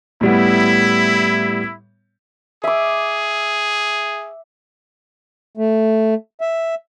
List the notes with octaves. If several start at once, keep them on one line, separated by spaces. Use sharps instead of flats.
A2 G3 B3 E4
G#4 E5 D6
A3
E5